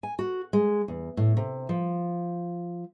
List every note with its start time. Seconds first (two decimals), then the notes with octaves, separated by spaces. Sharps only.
0.03 G#5
0.19 F#4
0.53 G#3
0.88 E2
1.17 A2
1.37 C3
1.69 F3